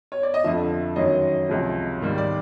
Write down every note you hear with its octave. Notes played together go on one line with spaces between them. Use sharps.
C#5
D5
D#5
F2 D3 F3 E5
F#2 D#3 F#3 D#5
C#2 C3 F3
G#2 D#3 G3
D5